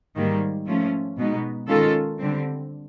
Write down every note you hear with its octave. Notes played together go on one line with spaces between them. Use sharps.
G#2 D#3 G3 A#3
F3 A3 C#4
B2 G#3 B3 D#4
D#3 G#3 C#4 F4 A4
D3 G3 C4